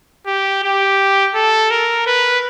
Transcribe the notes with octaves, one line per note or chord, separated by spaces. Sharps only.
G4
G4
A4
A#4
B4